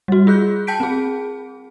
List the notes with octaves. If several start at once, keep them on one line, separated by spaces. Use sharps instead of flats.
G3 F#4
F4 G#4 F#6 G6
G5 A5 G6 B6 D7
C4 G#4